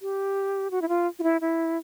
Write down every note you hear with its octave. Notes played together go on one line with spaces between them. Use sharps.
G4
F#4
E4
F4
F4
E4
E4